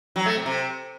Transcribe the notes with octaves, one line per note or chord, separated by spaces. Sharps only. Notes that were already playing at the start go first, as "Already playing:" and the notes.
F#3
A3
C3
C3